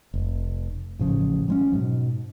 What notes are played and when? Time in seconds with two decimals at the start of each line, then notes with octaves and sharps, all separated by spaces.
0.14 F1
0.99 A1 A2 C#3 F3
1.48 F#3 G#3 C#4
1.73 G#2 B2